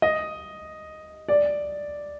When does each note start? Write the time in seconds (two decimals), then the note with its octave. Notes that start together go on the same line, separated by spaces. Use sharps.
0.02 D#5
1.28 D5